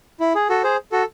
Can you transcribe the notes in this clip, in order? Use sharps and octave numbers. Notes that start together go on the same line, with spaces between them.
E4
G#4
F#4 A4
G#4 C5
F#4 A4